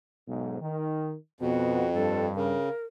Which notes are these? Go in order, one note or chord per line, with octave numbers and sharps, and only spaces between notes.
B1 G#2
D#3
F2 B2 B3 F#4
G2 A4
C#3 A#4